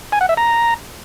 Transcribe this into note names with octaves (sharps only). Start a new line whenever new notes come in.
G#5
F#5
E5
A#5